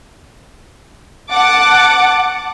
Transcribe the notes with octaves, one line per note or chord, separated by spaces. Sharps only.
F#5 A5 D6